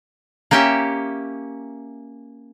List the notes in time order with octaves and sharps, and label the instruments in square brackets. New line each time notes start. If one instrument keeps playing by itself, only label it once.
[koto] A#3 C#4 G4 C#5 E5